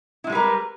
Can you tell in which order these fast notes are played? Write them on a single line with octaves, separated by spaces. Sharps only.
E4 G#3 G3 B4 A#4